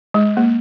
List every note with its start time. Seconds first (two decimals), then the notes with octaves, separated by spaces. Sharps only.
0.14 G#3
0.37 A#3